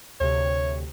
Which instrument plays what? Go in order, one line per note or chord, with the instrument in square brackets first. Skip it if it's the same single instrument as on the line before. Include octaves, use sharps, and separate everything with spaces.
[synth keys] D2 C3 [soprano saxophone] C#5